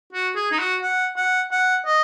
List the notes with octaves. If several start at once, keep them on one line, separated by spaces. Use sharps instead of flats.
F#4
G#4
D#4
F#4
F#5
F#5
F#5
D#5